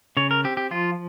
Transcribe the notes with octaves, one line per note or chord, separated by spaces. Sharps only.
C#3 C#5
A#4
C4 G4
G4
F3 F4